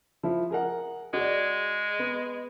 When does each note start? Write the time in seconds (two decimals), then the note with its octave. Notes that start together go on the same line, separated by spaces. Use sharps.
0.23 F3 E4
0.50 G#4 A#4 F#5
1.13 G#3 F#4 D5
1.99 B3